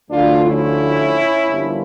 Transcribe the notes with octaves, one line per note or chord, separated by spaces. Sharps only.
D2 D3 F3 A3 D4 F4
C#4 E4
G1 G2 F3 A#3